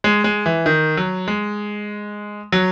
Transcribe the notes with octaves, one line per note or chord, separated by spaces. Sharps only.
G#3
G#3
E3
D#3
F#3
G#3
F#3